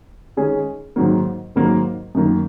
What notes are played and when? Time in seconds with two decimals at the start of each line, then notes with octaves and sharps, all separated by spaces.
0.37 D#3 G#3 C#4 G#4
0.96 G#2 D#3 F#3 A#3
1.56 G#2 D#3 F#3 A#3
2.15 F#2 D#3 A#3